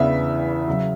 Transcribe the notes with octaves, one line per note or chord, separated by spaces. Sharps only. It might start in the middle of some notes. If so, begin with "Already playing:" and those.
Already playing: E2 C#3 E3 B3 D4 E5
C#3 F#3